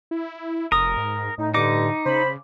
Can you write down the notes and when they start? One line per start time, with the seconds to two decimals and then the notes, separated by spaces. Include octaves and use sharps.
0.11 E4
0.72 F1 A#4 D#6
0.97 G#2
1.38 A2 D#4
1.54 G2 D3 D#4 D6 C#7
2.06 C#3 C5 B5